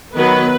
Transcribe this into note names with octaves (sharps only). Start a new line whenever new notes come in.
D#3 F#3 B3 B4